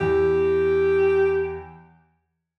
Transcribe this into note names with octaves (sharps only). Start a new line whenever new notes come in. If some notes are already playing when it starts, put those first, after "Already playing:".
E2 G4